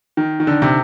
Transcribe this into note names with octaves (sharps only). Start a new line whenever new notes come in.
D#3
D#3
D3
C3